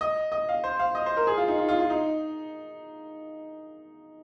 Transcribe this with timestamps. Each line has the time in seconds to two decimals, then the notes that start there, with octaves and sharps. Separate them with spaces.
0.01 D#5
0.32 D#5
0.49 F5
0.64 C5
0.79 F5
0.95 D#5
1.06 C5
1.17 A#4
1.27 G#4
1.37 F4
1.48 D#4
1.58 F4
1.68 F4
1.80 F4
1.90 D#4